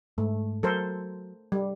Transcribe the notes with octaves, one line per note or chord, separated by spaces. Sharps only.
G#2 A3
F#3 A4 A#4 C5
G3